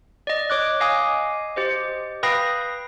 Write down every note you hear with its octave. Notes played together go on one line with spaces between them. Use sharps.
D5 D#5
C#5 D6 F#6
D#5 F5 G#5 D6 D#6
G4 C5 D#5
B4 F5 G5 B5 D#6 A#6